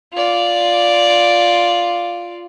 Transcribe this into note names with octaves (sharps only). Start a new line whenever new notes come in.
F4 D5